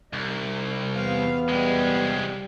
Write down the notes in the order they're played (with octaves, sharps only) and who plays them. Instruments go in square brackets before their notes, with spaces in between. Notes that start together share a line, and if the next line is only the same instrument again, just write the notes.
[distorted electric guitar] C2 [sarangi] D#4
[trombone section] E2 B3 [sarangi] F5
[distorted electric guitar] C2 G#3 [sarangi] G3